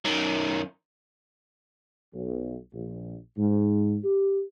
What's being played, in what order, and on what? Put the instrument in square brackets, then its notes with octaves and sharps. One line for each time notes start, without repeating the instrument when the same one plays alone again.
[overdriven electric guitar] F#2 D#3
[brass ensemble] B1
A#1
G#2
G4